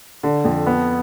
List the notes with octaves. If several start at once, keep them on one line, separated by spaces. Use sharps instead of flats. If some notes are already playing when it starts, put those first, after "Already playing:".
D3
F2
B3